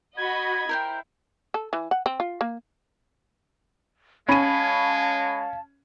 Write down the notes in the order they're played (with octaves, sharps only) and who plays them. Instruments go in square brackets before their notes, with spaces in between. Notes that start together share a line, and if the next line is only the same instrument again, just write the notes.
[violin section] F#4 D#5 B5 [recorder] G#6
[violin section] E4 [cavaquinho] A#4 C5 G5
[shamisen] A4
E3
F#5
C4
F4
A#3
[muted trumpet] G#3 [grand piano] C#4 D#7 [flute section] F5 A5 [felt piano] B5